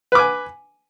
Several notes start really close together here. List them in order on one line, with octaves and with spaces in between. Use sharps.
B4 D6 G#5